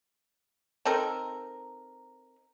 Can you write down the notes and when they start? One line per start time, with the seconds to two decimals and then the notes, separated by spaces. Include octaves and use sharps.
0.85 C4 D#4 A4 A#4